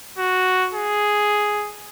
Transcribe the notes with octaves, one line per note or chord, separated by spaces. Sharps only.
F#4
G#4